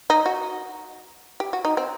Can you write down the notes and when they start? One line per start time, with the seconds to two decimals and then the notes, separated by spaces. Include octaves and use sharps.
0.10 D#4
0.26 F#4
1.40 G4
1.53 F#4
1.65 D#4
1.77 C4